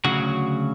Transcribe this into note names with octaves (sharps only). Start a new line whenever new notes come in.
D2 C#3 F#3 F#4